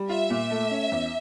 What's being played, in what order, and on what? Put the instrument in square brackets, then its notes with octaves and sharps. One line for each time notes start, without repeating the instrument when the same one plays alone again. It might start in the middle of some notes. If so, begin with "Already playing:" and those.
Already playing: [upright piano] G3
[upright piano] F4 [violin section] E5
[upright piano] A#2
A3
C#4
E2